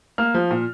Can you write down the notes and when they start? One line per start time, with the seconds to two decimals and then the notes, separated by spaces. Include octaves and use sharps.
0.18 A#3 F6
0.34 F3
0.51 A#2